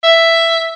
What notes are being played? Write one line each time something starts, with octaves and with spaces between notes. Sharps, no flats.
E5